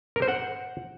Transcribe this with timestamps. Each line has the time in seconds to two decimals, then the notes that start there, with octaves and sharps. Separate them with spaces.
0.16 A#4
0.22 C5
0.28 F#5